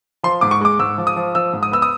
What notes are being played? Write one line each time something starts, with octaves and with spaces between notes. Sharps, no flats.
F3 C6
G#2 D6
C#6
G#3 D6
G#2 E6
F3
D#6
F3
F3 E6
G#2
D#6
B3 E6
D#6